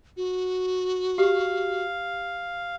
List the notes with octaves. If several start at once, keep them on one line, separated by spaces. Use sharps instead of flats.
F#4
G4 F5